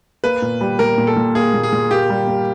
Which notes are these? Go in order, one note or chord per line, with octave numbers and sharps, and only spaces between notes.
A#3 B4
A#2
G3
A#2 A#4
A#2
A4
A#2
A#3 G#4
A#2
G#4
A#2
A#3 G4
G3
A#3